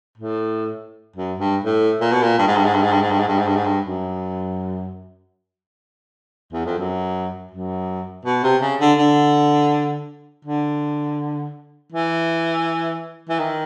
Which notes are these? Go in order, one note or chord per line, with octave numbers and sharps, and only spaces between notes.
A2
F#2
G2
A2
A#2
B2
A#2
G2
G#2
G2
G#2
G2
G#2
G2
G#2
G2
G#2
G2
G#2
G2
G#2
G2
F#2
E2
F2
F#2
F#2
B2
C3
C#3
D3
D3
D3
E3
E3
D#3